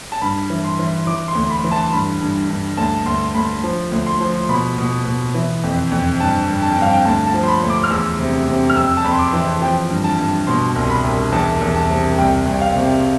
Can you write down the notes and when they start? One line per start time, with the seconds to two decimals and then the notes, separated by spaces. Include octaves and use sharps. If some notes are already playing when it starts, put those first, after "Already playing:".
0.12 A5
0.21 G2 B5
0.50 E3
0.65 C6
0.79 E3
1.07 E3 D6
1.28 C6
1.35 D2
1.50 B5
1.64 E3
1.71 A5
1.93 G2 B5
2.21 G2
2.50 G2
2.77 D2 A5
3.06 D2 C6
3.34 D2 B5
3.64 F3
3.91 D2
4.06 C6
4.20 F3
4.49 B2 B5
4.78 B2
5.05 B2
5.35 E3
5.63 F2
5.91 F2
6.20 G2 A5
6.48 G2
6.63 A5
6.72 G2 G5
6.82 F5
6.90 G5
7.05 D2 A5
7.26 A5
7.34 F3
7.43 C6
7.48 B5
7.62 D2
7.70 D6
7.84 F6
7.90 E2 E6
8.19 C3
8.48 C3
8.70 F6
8.76 F2 E6
8.97 A5
9.04 F2 B5
9.12 C6
9.19 D6
9.33 E3
9.62 F3 G5
9.90 G2
10.04 A5
10.18 G2
10.47 B2 C6
10.76 C2
10.90 B5
11.04 C2
11.32 E2 A5
11.62 E2
11.76 A5
11.89 C3
12.18 C2 G5
12.46 C2
12.53 G5
12.61 F5
12.75 C3